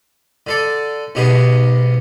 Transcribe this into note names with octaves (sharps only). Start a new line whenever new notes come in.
D3 A4 D5
B1 G#2 B2 G4 G#4